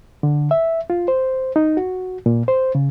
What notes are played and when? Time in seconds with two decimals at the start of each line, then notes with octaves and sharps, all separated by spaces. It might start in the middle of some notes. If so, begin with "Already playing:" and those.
0.23 D3
0.51 E5
0.90 F4
1.08 C5
1.56 D#4
1.77 F#4
2.26 A#2
2.48 C5
2.75 C#3